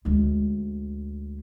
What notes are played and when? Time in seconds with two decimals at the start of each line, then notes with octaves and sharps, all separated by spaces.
0.05 D2 G#3